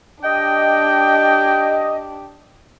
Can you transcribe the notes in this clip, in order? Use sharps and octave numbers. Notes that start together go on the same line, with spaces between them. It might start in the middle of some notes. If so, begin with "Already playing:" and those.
D4 G4 D#5 G5